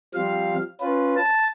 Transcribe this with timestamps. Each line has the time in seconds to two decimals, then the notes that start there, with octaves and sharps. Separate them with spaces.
0.14 F3 G3 C4 F5
0.81 C#4 F4 B4
1.16 A5